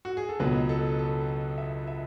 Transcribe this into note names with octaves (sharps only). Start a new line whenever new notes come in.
F#4
G#4
A4
C#2 B2 F#3 B4
A4
A4
E5
E5